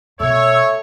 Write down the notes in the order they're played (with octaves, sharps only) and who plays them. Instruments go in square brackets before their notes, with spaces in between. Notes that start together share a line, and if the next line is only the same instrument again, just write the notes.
[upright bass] B2 [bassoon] A3 [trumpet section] C#5 [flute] E6